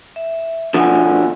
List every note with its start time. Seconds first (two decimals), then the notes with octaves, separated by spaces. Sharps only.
0.16 E5
0.74 B2 D3 F3 F#5 G#5